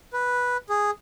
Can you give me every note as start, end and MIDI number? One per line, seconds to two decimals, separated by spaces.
0.13 0.57 71
0.69 0.91 68